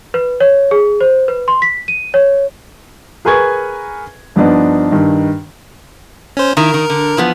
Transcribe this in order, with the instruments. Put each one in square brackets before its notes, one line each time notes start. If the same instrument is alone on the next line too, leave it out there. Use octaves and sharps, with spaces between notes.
[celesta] B4
C#5
G#4
C5
B4
C6
B6
D#7
C#5
[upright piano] G#4 A#4 B4 G#5 C#6 G#6
G2 F3 B3 D4 D#4
G2 D#3
[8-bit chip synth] C#4 C5
[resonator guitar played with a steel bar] D#3 E4 [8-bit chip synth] A#4
[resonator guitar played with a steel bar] D#3
D3
E3 F3 B3